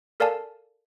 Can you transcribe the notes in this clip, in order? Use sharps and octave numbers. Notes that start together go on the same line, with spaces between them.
A4 A#4 D5 F5 G#5 A5